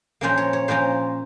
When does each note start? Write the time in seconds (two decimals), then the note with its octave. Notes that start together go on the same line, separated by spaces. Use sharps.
0.21 A#2 F3 A#3 C#4 C5
0.38 C#5
0.53 C#5
0.68 A#2 F3 A#3 C#4 C5